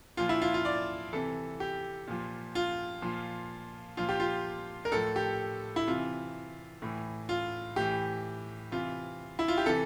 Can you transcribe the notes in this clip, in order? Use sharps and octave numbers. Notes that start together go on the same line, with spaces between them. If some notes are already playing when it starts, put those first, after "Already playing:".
A#2 F3 F4
E4
F4
F4
D5
C3 E3 A4
G4
A#2 F3
F4
A#2 F3
A#2 F3 F4
G4
F4
A#4
A2 F3 A4
G4
E4
C3 E3 F4
A2 E3
F4
A2 E3 G4
C3 E3 F4
E4
F4
G4
C3 E3 A4